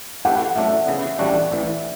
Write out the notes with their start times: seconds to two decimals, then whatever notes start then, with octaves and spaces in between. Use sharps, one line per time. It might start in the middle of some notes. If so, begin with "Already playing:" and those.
0.25 A2 E3 A3 E4 G4 F#5
0.56 A2 F#3 A3 D4 E5
0.87 C#3 E3 B3
1.19 A1 A2 G3 D4 F#4 D5
1.50 A1 A2 E3